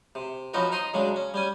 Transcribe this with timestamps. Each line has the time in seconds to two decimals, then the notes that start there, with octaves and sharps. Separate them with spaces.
0.15 C3
0.54 F3 F#3 C#4 D#4 F#4 B4
0.72 D#4 A#5 C6 D#6
0.94 C#3 F#3 G#3 D4
1.16 C#4
1.34 G3 C#4 G#5